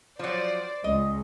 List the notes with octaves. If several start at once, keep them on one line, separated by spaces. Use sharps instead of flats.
F3 F#3 C5 D5
C#2 D#5